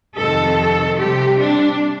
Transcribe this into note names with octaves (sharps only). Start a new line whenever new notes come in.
F2 C3 D#3 A4
C3 G3 C4 G4
D4